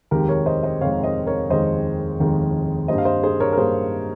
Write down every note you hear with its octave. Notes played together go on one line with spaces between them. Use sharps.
F1 D#2 D#3 G#3 G4 A#4
A#4 C#5
C5 D#5
C5 D#5
F1 D#2 D#3 G#3 C#5 F5
C5 D#5
A#4 C#5
F1 D#2 D#3 G#3 C5 D#5
F1 D#2 D#3 G#3
G2 G3 A#3 C5 D#5
F5
C5 D#5
G#4 C5
A#4 C#5
A#4
G2 G3 A#3 G#4 C5